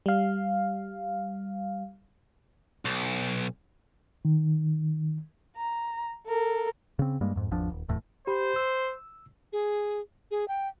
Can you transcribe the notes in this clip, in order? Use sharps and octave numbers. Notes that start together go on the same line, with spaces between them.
G3 F5
B1
D#3
A#5
A4 A#4
C#3 C4
G2 G3 G#3 A#3
F2 G#2
G#1 E2 F3 D4
D#1
D1 E2 A2
G4 C5 B5
E6
G#4
G#4
G5